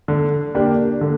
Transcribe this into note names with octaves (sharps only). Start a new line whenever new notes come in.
D3
A#3 D4 G4
D3